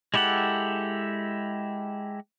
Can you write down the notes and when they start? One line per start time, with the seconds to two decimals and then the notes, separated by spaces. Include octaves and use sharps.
0.14 G#3 E4 G4 A4 F#5